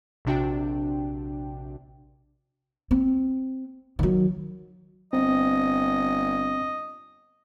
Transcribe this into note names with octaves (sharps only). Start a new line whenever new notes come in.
A#1 C3 D4 F#4 G5
C4
D#3 F#3
G1 C4 D#5